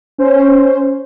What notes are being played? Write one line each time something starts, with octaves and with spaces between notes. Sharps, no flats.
C#4 C5